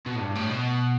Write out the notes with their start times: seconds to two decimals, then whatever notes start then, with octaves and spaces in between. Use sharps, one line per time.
0.06 B2
0.16 A2
0.21 G2
0.36 A2
0.50 B2